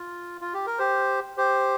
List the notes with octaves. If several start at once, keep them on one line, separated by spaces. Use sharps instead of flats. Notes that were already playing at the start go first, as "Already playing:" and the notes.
Already playing: F4
F4
G4
A#4
G4 C5
G4 C5